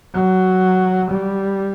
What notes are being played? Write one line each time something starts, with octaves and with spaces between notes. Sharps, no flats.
F#3
G3